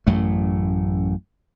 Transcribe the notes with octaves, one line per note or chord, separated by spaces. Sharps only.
A1 F#2 A2 A3